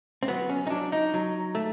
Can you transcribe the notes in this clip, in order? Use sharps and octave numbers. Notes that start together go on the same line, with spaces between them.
C4
F#3 B3
C#4
D#4
F#3 D4
D#4
F#3
A3